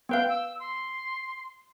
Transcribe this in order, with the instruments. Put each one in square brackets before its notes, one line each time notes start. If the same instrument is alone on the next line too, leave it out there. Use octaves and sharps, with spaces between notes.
[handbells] B3 B4 F5 [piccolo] G5
[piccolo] E6
C6